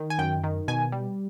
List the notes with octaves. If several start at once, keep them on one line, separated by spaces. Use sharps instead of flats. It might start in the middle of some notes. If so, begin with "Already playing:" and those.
Already playing: D#3
G#5
F#2 G5
D#3
B2 G#5
G3